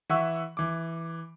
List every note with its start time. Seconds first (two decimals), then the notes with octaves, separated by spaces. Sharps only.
0.10 E3 E5 F#5 C#6 E6
0.57 E3 D6